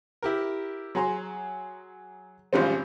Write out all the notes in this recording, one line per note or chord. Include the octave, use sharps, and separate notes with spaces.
E4 G4 A#4
F#3 G#4 A#5 C6
G#1 G#2 C#3 F3 G3 C4